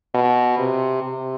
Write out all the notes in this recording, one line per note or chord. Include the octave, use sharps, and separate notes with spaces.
B2
C3
C3